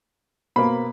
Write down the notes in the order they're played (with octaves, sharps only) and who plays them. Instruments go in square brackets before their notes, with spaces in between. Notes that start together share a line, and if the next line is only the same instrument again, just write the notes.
[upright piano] B2 A#3 B5